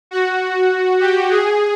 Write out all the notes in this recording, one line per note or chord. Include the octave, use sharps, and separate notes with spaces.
F#4
G4
G#4